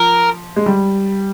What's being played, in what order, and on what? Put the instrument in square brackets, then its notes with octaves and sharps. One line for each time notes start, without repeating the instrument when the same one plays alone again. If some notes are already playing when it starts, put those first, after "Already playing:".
Already playing: [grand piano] F3 [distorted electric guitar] A#4
[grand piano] G#3
G3